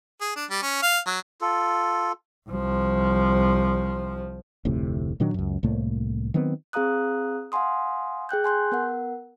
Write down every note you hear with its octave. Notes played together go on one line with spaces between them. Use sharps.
G#4
D4
G3
C#4
F5
F#3
F4 A4
C2 F3
F1 D2 A2 C3
A#2 D#3 F#3 D4
C#2 F#2
C2 A2 A3 A#3
D#3 F#3 B3 C4
C4 G#4 F5 A#5 D#6 F#6
F5 F#5 G#5 C6 D#6
G#4 G5 F#6 G6
G#5 C6 F#6 G6
B3 A#4 F#5